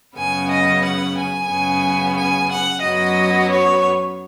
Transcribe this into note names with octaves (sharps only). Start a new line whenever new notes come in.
F#2 C#3 B3 G#5
D#5
F#5
G#5
F#2 C#3 B3
G#5
F#5
F#2 F#3 B3 D#5
C#5